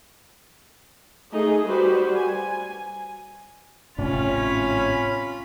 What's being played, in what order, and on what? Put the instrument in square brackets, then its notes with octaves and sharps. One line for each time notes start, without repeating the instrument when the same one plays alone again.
[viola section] A3 D#4 G#4 D#5
G3 F#4 B4 C5
G#5
[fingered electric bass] G#1 A2 C3 [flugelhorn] C#4 [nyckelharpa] F4 B5